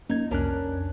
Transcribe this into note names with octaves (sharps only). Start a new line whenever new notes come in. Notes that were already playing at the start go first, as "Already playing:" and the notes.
A#3 C#4 D#4 G#6
C2 F2 C#4 D4 A#4 F#6